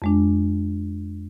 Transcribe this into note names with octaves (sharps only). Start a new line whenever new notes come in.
F2 G#3 D4